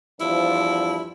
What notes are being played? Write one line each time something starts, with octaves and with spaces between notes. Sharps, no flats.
E2 G2 F3 E4